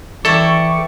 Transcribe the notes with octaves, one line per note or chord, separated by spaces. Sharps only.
E3 E4 A4 D5 G5 C#6 D6